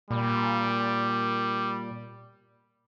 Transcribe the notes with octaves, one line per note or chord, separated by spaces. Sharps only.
A#2 G3